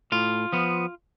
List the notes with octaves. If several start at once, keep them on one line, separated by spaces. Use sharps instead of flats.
A2 F4
F3 B3